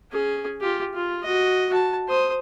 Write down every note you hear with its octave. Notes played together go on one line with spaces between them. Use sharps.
C#4 G#4
F4 G4
F4
F#4 D#5
F#4 A5
C5 D#6